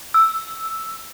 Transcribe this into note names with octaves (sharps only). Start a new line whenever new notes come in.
E6